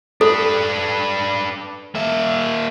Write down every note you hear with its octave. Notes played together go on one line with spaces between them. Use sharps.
D4 A4 B4
A#3 E5